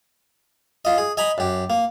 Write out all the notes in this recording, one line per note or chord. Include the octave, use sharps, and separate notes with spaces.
F4 D#5
G#4
D#5 G#5 A#5 B5
F#2 G4
A#3